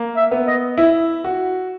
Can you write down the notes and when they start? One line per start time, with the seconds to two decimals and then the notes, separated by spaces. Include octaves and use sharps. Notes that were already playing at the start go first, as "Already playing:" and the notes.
Already playing: A#3
0.16 E5
0.31 B3
0.47 D#5
0.77 E4 E5
1.24 F#4